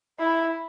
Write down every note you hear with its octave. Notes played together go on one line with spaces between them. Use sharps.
E4